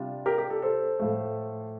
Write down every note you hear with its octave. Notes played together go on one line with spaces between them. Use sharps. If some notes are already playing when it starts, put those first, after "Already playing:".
Already playing: C3 G3 D4 F4
G4 A#4
G4
A4
A4 C5
A2 F3 A3